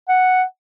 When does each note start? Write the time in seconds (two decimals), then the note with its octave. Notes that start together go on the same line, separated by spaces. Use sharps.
0.08 F#5